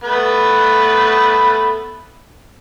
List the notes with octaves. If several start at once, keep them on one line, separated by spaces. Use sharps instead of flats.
A3 B3 B4